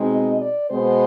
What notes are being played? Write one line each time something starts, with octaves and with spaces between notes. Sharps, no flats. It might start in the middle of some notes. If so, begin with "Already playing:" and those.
Already playing: B2 G#3 C4 D#4
D#5
D5
B2 G#3 B3 C5